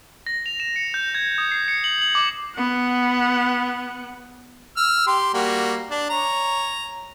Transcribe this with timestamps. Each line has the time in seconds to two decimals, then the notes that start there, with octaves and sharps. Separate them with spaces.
0.26 A#6
0.46 F7
0.60 E7
0.76 C#7
0.94 G6
1.15 G#6
1.38 D#6
1.51 C7
1.68 C#7
1.84 F#7
2.02 F#7
2.15 D6
2.55 B3 F#5
4.77 E6 F6
5.07 G4 C6
5.34 G3 A#3 F#4
5.91 D4
6.10 C#5 A#5